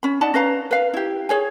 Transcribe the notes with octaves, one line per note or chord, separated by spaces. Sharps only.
C#4 B5
D#4 D5 F#5 A5
C#4 B4 F5 A#5
B4 F5
E4 G4
G#4 C#5 G#5